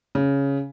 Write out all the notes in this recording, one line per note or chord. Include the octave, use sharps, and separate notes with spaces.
C#3